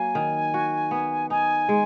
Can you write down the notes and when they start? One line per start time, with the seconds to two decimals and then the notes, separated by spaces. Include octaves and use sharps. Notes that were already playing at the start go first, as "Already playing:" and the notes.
Already playing: F#3 A#3 G#5
0.15 D#3
0.54 F#4
0.91 B3
1.30 D#4 G#5
1.69 G#3